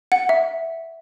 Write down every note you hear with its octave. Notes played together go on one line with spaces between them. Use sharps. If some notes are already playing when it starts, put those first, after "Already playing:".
F#5
E5